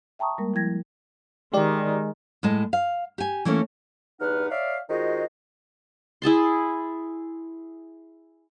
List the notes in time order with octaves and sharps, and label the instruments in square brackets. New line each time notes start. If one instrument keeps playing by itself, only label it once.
[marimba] E5 G5 A5 A#5 C#6 D#6
G3 G#3 A#3 A#4
F3 E4 G5 G#6 A#6
[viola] D#3 [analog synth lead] G#3 [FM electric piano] G4 D5
[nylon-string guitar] A2 G#3 A5
F5
G4 G#5
E3 A3 A#3 C#4
[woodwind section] E2 G2 D#4 B4 F#5 F6
C#5 D5 E5 F5
D#3 G#3 F4 F#4 C5 D#5
[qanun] E4 G#4 A5 C6